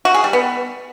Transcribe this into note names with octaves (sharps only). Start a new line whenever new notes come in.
F#4
G#4
G3
B3